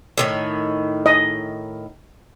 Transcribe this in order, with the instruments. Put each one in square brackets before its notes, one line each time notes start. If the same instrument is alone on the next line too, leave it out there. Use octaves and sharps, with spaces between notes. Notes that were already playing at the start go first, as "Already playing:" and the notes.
[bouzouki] A2 D#3 C#5
[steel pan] D#5